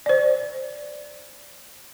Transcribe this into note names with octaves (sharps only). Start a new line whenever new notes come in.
C5 D5